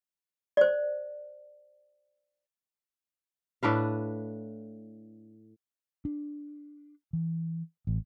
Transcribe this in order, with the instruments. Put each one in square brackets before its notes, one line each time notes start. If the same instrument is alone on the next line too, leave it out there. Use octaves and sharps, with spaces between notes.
[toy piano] C5 D5
[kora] A2 D4 B4 F5
[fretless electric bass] D4
E3
A1